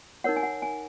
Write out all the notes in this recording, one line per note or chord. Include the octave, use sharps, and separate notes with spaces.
D#4 A#4 C#5 F#5
G#5
F#5
G#5